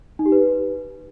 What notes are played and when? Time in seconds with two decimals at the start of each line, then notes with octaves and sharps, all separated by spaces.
0.19 D#4
0.26 G4
0.32 B4